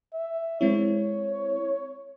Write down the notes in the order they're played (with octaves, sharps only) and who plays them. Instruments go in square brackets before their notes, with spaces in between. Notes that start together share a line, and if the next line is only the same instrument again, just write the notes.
[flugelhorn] E5
[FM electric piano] G#3 C4 E4 [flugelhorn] C#5